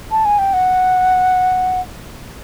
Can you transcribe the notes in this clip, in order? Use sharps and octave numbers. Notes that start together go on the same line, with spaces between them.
A5
G#5
G5
F#5